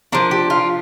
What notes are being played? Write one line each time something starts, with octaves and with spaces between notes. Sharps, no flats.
F3 D4 A#4
G4
F4